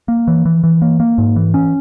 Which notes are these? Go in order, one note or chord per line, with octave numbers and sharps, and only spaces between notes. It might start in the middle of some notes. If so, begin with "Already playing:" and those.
A#3
E3
E3
E3
A#3
A#3
G#2
E3
C#4